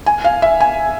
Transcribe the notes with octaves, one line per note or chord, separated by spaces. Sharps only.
G#5
F5
E5
G#5